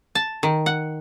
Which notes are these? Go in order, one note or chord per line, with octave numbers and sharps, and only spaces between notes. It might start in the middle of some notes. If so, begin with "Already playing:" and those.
A5
D#3
F#5